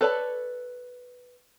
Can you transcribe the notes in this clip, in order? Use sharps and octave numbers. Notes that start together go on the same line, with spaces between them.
A4 B4 C#5 D5 A5